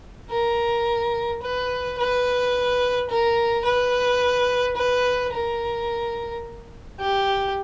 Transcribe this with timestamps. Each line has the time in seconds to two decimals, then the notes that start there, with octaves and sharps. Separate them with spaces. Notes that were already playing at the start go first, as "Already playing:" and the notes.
0.30 A#4
1.42 B4
1.98 B4
3.10 A#4
3.65 B4
4.76 B4
5.32 A#4
6.99 G4